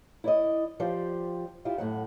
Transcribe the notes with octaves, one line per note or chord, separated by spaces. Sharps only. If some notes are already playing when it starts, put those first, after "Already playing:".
E4 D5 D#5
F3 G4 C5 D5
E4 F4 G4
F#2 A2 F#3 F#5